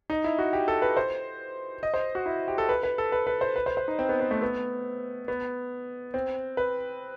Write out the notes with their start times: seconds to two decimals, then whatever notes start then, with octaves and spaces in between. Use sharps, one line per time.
0.10 D#4
0.24 E4
0.39 F#4
0.53 G4
0.68 A4
0.82 B4
0.97 C5
1.83 D#5
1.94 C5
2.15 F#4
2.26 E4
2.48 G4
2.58 A4
2.69 B4
2.83 B4
2.98 A4
3.12 B4
3.27 B4
3.41 C5
3.56 B4
3.66 C5
3.77 C5
3.88 D#4
3.99 C4
4.09 B3
4.20 B3
4.31 A3
4.42 B3
5.28 B3
6.14 C4
6.57 B4